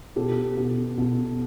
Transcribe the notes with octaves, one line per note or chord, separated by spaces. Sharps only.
B2 G4 A4
B2
B2